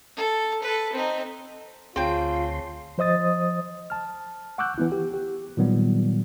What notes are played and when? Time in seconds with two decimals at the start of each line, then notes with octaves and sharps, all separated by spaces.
0.16 A4
0.62 A4 B4
0.93 C4 D#4
1.96 D2 C4 F4 G#4 C#5 G5 A5 C6
2.98 F3 C5 D#5 D#6 A6
3.90 A5 F6
4.58 F#5 C#6 D6 E6 F#6 G6
4.78 E3 B3 E4
4.92 G4
5.14 G4
5.57 A#2 D#3 F#3 G3 B3